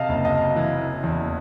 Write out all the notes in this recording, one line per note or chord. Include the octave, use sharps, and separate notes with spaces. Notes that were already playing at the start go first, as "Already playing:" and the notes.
Already playing: C3 D#5 F5 A5
F#1
D#5 F5
E3
E2